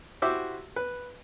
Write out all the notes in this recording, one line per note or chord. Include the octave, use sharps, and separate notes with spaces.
E4 F#4 G4 C5 E5 D6
B4